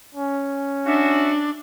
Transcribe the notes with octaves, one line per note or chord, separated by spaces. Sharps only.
C#4
D4 F#4 E5